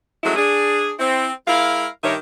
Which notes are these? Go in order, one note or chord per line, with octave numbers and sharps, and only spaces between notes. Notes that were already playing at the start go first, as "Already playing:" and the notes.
F3 F#3 G#3 A3 C#4 E4
D4 G#4
C4 E4
G#3 E4 A#4 F5
G2 D#3 G4 A#4 C#5 E5